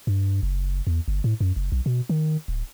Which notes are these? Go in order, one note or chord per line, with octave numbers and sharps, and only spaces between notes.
G2
F#1
E2
G1
A2
F#2
F#1
B1
B2
D#3
D1